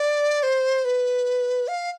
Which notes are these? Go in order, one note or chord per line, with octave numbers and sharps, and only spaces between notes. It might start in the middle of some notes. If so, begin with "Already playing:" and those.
Already playing: D5
C5
B4
F5